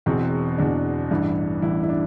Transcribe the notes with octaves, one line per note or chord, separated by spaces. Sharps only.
E1 E2 B2 C4
E1 E2 B2 D4
A1 G2 E3
A1 G2 E3 E4
E4
D4